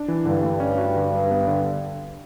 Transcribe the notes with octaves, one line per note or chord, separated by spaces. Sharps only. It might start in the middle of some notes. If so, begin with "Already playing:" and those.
Already playing: D4
E3
G2 D3
A3
C#4
F#4
D3
G3
B3
D3